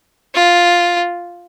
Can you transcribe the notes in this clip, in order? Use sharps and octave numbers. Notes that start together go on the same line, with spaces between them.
F4